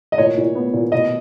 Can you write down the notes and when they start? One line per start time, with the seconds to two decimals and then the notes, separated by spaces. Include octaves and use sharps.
0.12 D#5
0.18 A#2 C#5
0.38 A#2
0.55 B3
0.73 A#2
0.92 B2 D#5